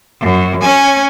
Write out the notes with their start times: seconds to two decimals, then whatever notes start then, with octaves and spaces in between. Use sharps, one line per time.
0.22 F#2
0.62 C#4 G#5